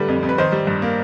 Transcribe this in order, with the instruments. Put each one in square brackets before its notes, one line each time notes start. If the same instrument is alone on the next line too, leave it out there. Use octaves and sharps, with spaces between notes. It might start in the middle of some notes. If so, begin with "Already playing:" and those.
Already playing: [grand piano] D3 G3 A3 B4
F2
F2
B4
D#3 C5
G3
G2
A#3